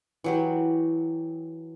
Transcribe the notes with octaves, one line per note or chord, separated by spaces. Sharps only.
E3 F#3 G4